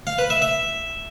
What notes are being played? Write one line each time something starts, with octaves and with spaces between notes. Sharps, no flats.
F5
B4
E5
E5